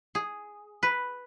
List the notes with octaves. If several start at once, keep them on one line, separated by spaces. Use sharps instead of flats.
G#4
B4